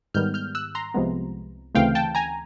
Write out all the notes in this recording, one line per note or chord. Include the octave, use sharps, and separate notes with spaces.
G#2 D#3 G3 B3 F6 G6
F6 G6
E6 F#6
A#5 C6
C2 C3 F3 G#3 B3
D2 C#3 E3 A3 C4 F5 G5
G5 A5
G#5 A#5